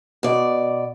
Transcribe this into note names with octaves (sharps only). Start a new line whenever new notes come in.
B2 D5